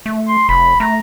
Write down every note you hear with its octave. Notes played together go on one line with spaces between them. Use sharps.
A3
C6
F1 B5
A3 A#5